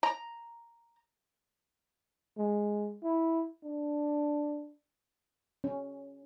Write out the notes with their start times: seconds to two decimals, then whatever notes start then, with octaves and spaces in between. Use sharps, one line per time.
0.03 A#5
2.37 G#3
3.03 E4
3.63 D4
5.64 C#4